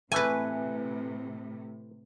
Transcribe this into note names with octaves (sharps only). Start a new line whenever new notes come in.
A2 C3 E3 A3 B4 G#5